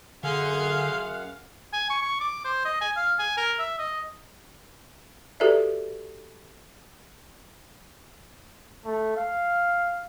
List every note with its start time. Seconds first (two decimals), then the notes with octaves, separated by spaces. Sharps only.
0.24 F#2 D3 G#4 F5 F#5 C6
1.73 G#5
1.90 C#6
2.02 C#6
2.20 D6
2.45 C5
2.65 D#5
2.81 G#5
2.96 F5
3.19 G#5
3.37 A#4
3.59 E5
3.79 D#5
5.40 F#4 G4 A4 B4 D5 E5
8.85 A3
9.17 F5